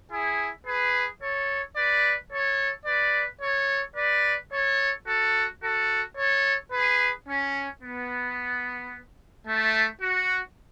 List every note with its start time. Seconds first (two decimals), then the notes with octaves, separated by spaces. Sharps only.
0.11 E4 G#4
0.66 G#4 B4
1.21 A4 C#5
1.76 B4 D5
2.32 A4 C#5
2.86 B4 D5
3.42 A4 C#5
3.96 B4 D5
4.52 A4 C#5
5.06 F#4 A4
5.62 F#4 A4
6.16 A4 C#5
6.71 G#4 B4
7.27 C#4
7.82 B3
9.47 A3
10.01 F#4